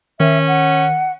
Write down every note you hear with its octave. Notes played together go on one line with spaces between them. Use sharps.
D#3 C#4 E5
F#5